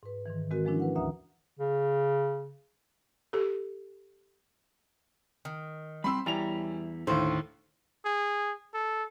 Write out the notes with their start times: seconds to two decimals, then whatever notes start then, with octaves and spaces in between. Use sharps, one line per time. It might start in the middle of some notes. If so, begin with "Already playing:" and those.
0.03 G#2 B4
0.26 G#2 D#3 E3
0.50 D#3 G#3 C4 F#4 A#4
0.65 E3 F3 G#3 C#4 D4 E4
0.80 B4 F#5
0.96 D2 D3 E5 F#5 A#5 D#6
1.59 C#3
3.33 G4 A4
5.45 D#3
6.04 G3 C4 B5 C6 E6
6.26 E2 G3 C#4 E4 A#5 F7
7.07 D#2 A2 D3 C5
8.05 G#4
8.74 A4